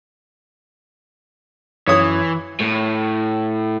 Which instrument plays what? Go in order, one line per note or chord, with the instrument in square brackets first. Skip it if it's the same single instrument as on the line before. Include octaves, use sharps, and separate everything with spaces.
[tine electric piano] F#2 [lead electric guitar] E3 [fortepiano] C#5 D#6
[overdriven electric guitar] A2